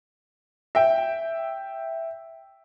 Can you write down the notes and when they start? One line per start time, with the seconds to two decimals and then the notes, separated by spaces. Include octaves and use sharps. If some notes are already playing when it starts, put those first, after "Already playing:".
0.75 E5 G5